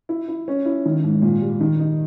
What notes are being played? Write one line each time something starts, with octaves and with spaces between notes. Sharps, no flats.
E4
E4
C#4
E4
D#3
G#2
A#2
G3
D#3
D#4